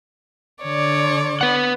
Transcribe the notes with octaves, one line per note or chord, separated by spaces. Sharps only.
D3 C#5 D5
B4 F#5